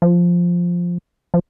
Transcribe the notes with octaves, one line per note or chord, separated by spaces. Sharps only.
F3
F3